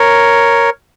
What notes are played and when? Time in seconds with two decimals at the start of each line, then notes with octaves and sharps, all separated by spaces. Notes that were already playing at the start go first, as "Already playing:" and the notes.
Already playing: A#4 C#5